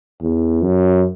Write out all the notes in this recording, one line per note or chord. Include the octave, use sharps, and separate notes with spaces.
E2
F#2